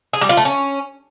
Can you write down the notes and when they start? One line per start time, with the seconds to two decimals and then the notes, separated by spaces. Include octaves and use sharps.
0.13 G#4
0.21 G3
0.29 F4
0.37 A3
0.45 C#4